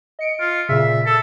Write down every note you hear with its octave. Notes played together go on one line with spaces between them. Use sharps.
D#5 C#7 D7
F4
A#2 C#3 E5
A4